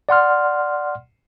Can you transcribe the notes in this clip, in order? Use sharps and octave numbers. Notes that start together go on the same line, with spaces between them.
D5 F#5 C6 F6